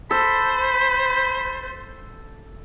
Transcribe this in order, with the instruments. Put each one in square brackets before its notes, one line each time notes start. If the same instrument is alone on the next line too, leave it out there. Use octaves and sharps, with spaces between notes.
[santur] A4 [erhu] C5 [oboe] B5